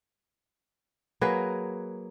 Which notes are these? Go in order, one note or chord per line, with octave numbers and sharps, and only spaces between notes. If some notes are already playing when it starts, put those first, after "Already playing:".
F#3 A#3 G#4 B4